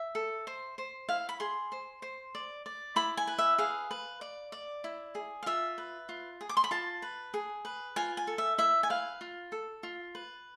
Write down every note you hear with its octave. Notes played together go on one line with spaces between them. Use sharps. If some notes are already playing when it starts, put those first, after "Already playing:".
Already playing: E5
A4
C5
C5
E4 F5
B5
G#4 C6
C5
C5
D5
D5
E4 B5
G#5
B4
E5
G#4 F5
B4
D5
D5
E4
G#4
F5
F4 E5
B4
F4
G#4
D6
C6
B5
F4 A5
B4
G#4
B4
F4 G#5
G#5
A4
E5
E4 E5
G#5
B4 F5
F4
A4
F4
B4